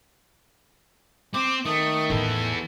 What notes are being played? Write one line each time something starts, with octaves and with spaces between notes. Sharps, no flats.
C4 D6
D#3 A3 D#6
A1 E3 B3 A4